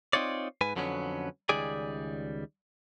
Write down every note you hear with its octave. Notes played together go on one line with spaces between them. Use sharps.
C4 D#4 F4 C#5 D5
G#2 B4 G#5
F2 D3 F#3 G3 B3 C#4
C#2 D#3 G3 G#4 D5 G#5